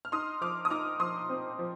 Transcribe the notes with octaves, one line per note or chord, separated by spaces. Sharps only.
F6
D#4 C6 D#6
F3 D6 F6
D#6
D#4 D6 F6
F3 C6 D#6
C4
F3